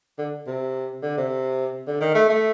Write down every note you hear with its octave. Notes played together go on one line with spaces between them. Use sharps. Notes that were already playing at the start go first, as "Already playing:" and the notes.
D3
C3
D3
C3
D3
D#3
A3
A3